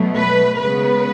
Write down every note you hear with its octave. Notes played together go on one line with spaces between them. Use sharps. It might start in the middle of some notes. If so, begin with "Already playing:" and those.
Already playing: B2 F#3 A3
B4
C#3 G#3 B3 B4